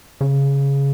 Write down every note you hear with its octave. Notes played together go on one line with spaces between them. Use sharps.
C#3